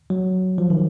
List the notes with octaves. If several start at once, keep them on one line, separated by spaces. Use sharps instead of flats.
F#3
F3
D#3